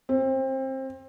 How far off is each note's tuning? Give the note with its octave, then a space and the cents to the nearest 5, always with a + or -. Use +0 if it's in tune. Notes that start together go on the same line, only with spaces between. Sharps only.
C4 +25